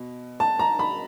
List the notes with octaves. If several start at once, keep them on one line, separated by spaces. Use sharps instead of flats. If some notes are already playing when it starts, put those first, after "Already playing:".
Already playing: B2
A5
A#5
B5